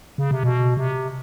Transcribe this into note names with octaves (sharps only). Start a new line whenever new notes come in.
C#3
C3
B2
C3